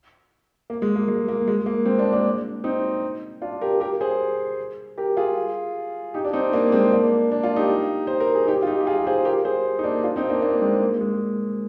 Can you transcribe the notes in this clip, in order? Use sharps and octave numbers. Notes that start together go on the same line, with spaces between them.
A#3
G#3
A#3
G#3
A#3
G#3
A#3
G#3 C4
A#3 D4
A#3 D4
C4 D#4
D4 F4
G4 A#4
G4 A#4
G#4 C5
G4 A#4
F4 G#4
D#4 G4
D4
C4 D#4
A#3 D4
G#3 C4
A#3 D4
A#3 D4
D4 F4
D#4 G4
C5
A#4
G#4
D#4 G4
F4
D#4 G4
G4
F4 G#4
G#4 C5
G4 A#4
G#4 C5
D#4
A#3 D4
D4 F4
C4 D#4
A#3 D4
A#3 D4
G#3 C4
A#3
G#3